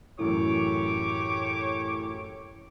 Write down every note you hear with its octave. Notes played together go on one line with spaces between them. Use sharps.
F#2 A2 E3 G4 C#5 D6